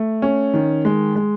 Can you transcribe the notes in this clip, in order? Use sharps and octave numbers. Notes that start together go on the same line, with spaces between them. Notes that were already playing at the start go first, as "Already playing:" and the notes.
Already playing: A3
C#4
D#3
G#3
G#3